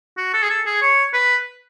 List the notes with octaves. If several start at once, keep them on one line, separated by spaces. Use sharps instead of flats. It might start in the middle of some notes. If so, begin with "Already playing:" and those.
F#4
A4
G#4
A4
G#4
C#5
B4